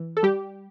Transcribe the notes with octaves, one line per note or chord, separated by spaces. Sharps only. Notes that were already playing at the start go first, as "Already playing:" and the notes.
Already playing: E3
A4
G3 G4